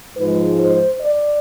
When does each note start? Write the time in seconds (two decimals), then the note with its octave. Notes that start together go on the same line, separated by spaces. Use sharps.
0.16 G#2 F3 G#3 B4
0.60 C5
1.02 D5